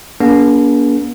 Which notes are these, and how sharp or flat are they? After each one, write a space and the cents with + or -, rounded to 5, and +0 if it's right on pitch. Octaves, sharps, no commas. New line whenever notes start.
A#3 +40 D4 -45 G#4 +10